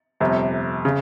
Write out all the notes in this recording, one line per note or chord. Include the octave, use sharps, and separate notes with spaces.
G1 F2 C3
C#3